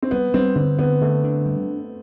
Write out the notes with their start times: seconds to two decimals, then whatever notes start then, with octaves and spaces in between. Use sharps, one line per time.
0.02 C4
0.11 G3 B3
0.34 G3 C4
0.56 D3 C4
0.79 D3 B3
1.01 D3 A3
1.24 D4
1.46 G3